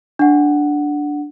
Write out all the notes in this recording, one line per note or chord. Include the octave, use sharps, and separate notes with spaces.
D4 F#5